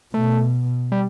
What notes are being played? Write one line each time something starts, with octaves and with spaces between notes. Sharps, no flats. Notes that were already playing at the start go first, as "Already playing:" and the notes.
B2 A3
G3